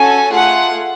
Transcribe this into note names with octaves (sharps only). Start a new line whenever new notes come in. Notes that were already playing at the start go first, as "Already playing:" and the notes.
Already playing: C#4 F#4 A4 G#5
A3 F4 G#4 F#5